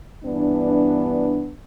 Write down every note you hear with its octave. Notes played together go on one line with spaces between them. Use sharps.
G2 E3 B3 D4